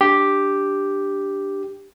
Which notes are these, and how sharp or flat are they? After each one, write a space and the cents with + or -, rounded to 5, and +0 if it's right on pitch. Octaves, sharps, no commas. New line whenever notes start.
D4 +0 G4 +0